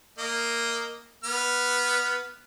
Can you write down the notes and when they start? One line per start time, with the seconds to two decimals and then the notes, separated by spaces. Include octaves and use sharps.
0.18 A#3 D#5
1.24 B3 F6